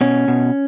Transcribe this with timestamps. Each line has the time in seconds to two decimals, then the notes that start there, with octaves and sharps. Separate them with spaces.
0.01 B2 C#4
0.28 B2